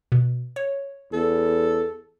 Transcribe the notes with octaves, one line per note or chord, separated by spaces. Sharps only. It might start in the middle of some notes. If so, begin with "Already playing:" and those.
B2
C#5
E2 A4